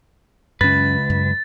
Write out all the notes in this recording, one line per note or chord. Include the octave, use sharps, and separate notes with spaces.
C#2 F#2 C#4 B4 A6
F#2